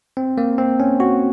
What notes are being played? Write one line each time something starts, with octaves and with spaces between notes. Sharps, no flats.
C4
A#3
C4
C#4
F#4